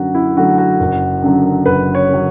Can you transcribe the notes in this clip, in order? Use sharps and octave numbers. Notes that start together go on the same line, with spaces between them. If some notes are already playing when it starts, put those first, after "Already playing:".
Already playing: F#2 D3 F#3 A3 F#4
E4
D3 F#3 A3 F#4
F#4
F#1
F#2 D3 F#3
F#1 B4
C#5
D3 F#3